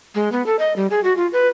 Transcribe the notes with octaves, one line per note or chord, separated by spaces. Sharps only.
G#3
B3
A4
D#5
G3
G#4
F#4
F4
B4